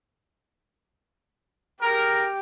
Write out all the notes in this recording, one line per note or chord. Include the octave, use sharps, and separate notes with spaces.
G4 G#4 A#4